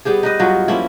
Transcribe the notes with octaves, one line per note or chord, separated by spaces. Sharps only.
G3 B3 G4 G#4
D#4 B4 D#5
G2 F#3 F4 F#4
F3 A#3 C#4 E4